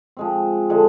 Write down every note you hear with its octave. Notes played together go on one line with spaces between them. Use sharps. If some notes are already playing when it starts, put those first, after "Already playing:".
F3 G#3 C4
D3 F3 G#3